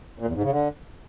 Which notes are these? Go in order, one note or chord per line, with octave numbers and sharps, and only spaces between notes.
A#2
E2
G#2
C#3
D3